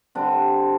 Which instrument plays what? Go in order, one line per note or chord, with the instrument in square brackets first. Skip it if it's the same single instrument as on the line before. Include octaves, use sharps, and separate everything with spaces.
[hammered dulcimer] D3 G3 C4 D4